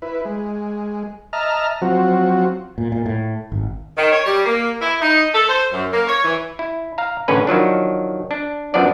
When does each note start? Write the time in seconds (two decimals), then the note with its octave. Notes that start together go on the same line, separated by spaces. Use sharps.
0.02 E4 B4
0.25 G#3
1.33 D#5 E5 A5 A#5 F6
1.82 F3 F#3 C4 F#4
2.78 A#2
2.92 A#2
3.06 A2
3.52 G#1
3.97 D#3
4.12 C#5
4.26 G3
4.45 A#3
4.82 E4
5.02 D#4
5.34 A4
5.49 C5
5.72 F#2
5.92 A#3
6.08 C#5
6.25 E3
6.59 E4
6.98 F5 A#5
7.28 A1 D3 C#4 B4
7.47 D#3 F3 F#3 D4
8.31 D4
8.74 F#2 F3 B3 D4 D5